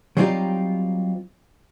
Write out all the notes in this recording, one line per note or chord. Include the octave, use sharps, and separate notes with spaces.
F#3 G3 C4 D#4 F4 G4